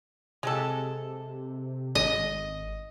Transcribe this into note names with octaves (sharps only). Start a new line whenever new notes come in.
C3 G#3 G4 A4
G#1 D#5